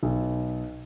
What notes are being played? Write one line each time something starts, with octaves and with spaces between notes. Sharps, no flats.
B1